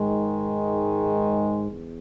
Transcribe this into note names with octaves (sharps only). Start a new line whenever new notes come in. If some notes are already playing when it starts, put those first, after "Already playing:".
Already playing: G#2 D#3 G#3
E2